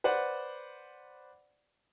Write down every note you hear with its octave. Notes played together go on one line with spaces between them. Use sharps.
B4 C5 D5 F#5